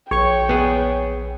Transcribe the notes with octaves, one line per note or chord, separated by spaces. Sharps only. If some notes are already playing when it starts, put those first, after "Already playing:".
A#1 C#5 G5 C#6
B3 G#4